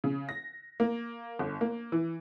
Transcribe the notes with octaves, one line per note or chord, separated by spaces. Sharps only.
C#3
A#6
A#3
G1
A#3
E3